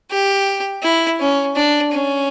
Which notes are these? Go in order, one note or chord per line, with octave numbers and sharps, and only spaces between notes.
G4
E4
C#4
D4
C#4